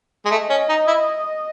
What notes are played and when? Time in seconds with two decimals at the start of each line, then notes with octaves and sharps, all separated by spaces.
0.25 G#3
0.30 A3 D#5
0.49 C#4
0.69 D#4
0.87 E4